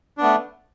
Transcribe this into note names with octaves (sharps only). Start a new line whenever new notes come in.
A3 B3 D4